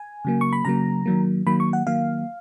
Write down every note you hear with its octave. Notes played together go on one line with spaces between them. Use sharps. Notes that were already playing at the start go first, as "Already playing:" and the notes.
Already playing: G#5
C#3 F#3 A#3
C#6
B5
C#3 F#3 A#3 A#5
D#3 F#3 A#3
D#3 F#3 A#3 B5
C#6
F#5
D#3 F#3 A#3 F5